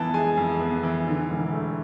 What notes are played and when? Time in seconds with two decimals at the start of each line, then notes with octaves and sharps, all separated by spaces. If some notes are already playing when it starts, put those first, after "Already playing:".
Already playing: F2 E3 B3 A5
0.14 G#3 G#5
0.38 F2
0.60 B3
0.83 E3
1.07 D3
1.30 E1
1.53 A3